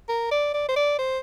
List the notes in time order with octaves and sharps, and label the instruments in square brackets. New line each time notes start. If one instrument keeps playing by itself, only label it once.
[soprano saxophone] A#4
D5
D5
C5
D5
C5